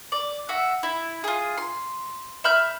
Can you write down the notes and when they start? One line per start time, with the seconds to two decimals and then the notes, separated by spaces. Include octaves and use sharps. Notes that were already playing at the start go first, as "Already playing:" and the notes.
0.12 D5
0.49 F#4 E5
0.83 E4
1.24 F4 G#4
1.57 C6
2.44 E5 B5 F6 G6